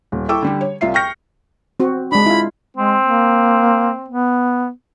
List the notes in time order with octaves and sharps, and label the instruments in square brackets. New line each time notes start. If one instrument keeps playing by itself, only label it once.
[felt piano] D#1
E4 A4 G5 C#6 D6 E6
D3 G3 G4
C#5
C2 F4 E5 C7
G5 C#6 F6 G6 A#6 C#7
[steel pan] C4 F#4
[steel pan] G#3 D4 [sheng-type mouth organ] B5
[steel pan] E4 F4
[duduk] G#3 [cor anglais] C4
[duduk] A#3
B3